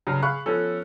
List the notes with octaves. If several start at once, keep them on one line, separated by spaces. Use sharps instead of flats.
G2 C#3 F#3
G#4 F5 B5 C#6 F#6
F3 B3 C#4 A4